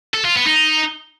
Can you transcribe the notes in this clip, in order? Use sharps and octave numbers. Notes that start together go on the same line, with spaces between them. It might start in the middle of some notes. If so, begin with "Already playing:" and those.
A4
F4
B3
D#4